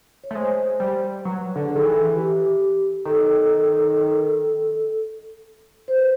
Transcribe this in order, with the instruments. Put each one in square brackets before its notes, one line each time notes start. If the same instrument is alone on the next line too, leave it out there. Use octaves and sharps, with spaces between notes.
[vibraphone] C#5
[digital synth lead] A3
[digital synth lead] G#3 [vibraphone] C5
[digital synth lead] G3
[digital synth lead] F#3 [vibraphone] B4
[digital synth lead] D3
[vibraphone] G#4
A4
[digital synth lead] D#3
E3
[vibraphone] G4
[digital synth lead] D#3 [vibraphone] A4
[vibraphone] C5
B4